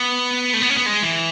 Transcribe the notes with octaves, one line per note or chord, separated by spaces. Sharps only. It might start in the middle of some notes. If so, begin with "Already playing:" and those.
Already playing: B3
A3
B3
C#4
B3
G#3
E3